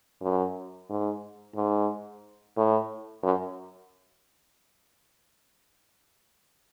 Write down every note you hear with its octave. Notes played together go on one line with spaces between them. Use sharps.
F#2
G#2
G#2
A2
F#2